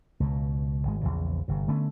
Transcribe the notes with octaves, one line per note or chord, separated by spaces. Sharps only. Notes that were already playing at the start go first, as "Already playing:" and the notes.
C#2 B2
G#1 G#3
A#1 E2 C#3
G1 C3
D3 A3 B3 C#4